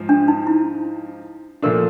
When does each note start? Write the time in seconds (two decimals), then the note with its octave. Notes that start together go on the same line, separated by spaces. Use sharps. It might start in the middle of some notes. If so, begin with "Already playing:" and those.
Already playing: G#2 F3
0.09 D4
0.28 D#4
0.47 E4
1.62 A#2 F3 A3 D4 A#4